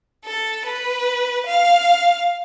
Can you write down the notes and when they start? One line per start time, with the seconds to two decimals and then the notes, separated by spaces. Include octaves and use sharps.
0.25 A4
0.65 B4
1.46 F5